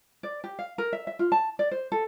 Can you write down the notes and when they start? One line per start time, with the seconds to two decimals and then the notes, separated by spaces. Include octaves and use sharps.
0.23 D5
0.44 G4
0.59 F5
0.78 A#4
0.93 E5
1.07 E5
1.19 F4
1.32 A5
1.59 D5
1.71 C5
1.92 A4